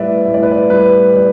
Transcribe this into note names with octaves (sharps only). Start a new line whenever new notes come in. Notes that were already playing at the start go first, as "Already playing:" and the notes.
Already playing: A2 G3 B4 D5 E5
A2 E5
D5
B4
D5
G3 B4
G3 D5